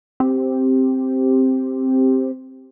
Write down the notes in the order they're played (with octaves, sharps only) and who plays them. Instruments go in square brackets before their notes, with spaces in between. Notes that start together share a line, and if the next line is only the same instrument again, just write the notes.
[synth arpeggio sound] C4 G4